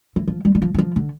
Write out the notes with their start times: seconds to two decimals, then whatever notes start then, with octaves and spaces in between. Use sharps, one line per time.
0.16 E3
0.28 F3
0.45 G3
0.55 G3
0.62 F3
0.74 E3
0.79 F3
0.96 D3